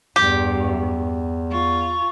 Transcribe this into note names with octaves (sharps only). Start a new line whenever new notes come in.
E2 G2 G4
F4 C#6